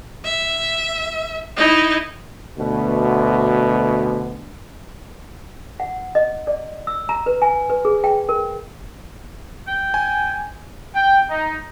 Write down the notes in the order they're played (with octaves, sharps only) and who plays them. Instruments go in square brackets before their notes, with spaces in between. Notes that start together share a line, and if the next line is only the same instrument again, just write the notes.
[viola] E5
D#4 E4
[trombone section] D2 B2
[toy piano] F#5
D#5
D5
E6
A#5
B4
G#5
B4
G#4
G5
A#4
[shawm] G5
[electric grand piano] G#5
[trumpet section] G5
D#4